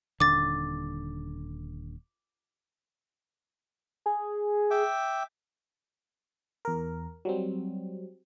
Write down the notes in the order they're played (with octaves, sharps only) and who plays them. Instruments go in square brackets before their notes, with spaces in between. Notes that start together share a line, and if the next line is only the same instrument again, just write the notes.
[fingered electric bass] D#1 D3 [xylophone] D6 A6
[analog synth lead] G#4
[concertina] E5 G5 D6
[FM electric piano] E2 A#4
F#3 G3 C4